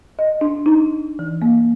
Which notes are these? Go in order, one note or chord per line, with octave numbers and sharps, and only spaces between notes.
D#5
D4
D#4
E3
A#3